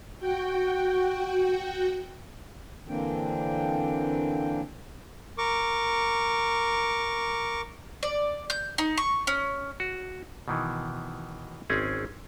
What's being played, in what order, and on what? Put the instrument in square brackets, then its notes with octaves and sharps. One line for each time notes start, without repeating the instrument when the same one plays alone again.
[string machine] F#4 G5
[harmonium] D3 E3 A#3 C4 D4 G5
[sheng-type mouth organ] A#4 C#6 D6
[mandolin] D5
G6
D#4
C#6
C#4
[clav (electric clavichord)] F#4
B2 D#3 E3
G#1 C4 C#4 G#4